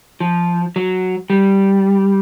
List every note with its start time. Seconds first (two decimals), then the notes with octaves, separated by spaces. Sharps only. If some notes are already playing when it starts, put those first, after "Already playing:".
0.20 F3
0.76 F#3
1.30 G3